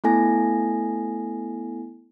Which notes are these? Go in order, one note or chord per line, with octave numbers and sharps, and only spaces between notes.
A3 B3 E4 A4 G#5 A#6